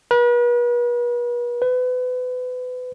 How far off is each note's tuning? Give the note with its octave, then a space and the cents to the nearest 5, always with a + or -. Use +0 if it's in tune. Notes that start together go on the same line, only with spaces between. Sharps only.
B4 -40
B4 +30